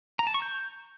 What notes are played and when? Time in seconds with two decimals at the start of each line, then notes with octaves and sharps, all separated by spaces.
0.19 A#5
0.27 A5
0.34 C#6
0.42 G6